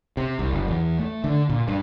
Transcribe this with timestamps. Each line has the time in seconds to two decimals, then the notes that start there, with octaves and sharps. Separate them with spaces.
0.17 C3
0.39 C2
0.53 F#1
0.68 E2
0.99 A3
1.24 D3
1.49 A#2
1.68 G2